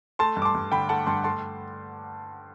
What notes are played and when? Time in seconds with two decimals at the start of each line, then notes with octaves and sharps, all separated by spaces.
0.19 A3 A5 C6
0.37 G2
0.42 D6
0.45 A5 C6
0.55 G2
0.72 D3 G5 B5
0.89 A3 F#5 A5
1.06 G2 A5 C6
1.24 A3 A5 C6